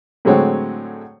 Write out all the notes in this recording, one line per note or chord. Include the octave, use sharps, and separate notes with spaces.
A2 D3 F#3 G#3 C4 C#5